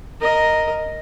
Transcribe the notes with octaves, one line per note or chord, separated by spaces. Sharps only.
A#4 D#5